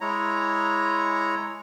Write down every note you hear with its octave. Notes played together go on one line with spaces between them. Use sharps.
G#3 E4 C#5 A#5